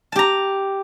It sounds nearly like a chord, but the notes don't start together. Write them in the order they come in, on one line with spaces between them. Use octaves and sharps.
A5 G4 A#5